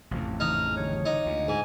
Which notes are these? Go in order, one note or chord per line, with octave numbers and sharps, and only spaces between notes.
A1 F2 A2 C3 F4
G#2 C#3 E3 D#4 F6
D3 G3 C#5 F#6
D#4 F#5 D6
D2 G#3 B3 F4
G#2 G#3 G#5